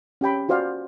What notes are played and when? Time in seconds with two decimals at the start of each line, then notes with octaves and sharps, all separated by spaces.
0.21 C#4 G4 G5 B5
0.49 F4 F#4 C5 D5 F5 G#5